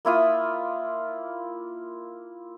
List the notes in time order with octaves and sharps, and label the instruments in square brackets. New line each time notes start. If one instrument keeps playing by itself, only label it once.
[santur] A#3 E4 F4 D#6